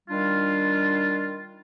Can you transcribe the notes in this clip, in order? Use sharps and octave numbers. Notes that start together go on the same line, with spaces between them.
D#3 G3 D4 F4